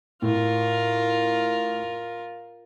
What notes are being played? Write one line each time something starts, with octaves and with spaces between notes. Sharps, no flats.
A2 F4 A#4